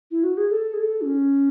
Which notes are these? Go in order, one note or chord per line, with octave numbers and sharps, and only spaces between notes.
E4
F#4
G#4
A4
G#4
A4
D4
C#4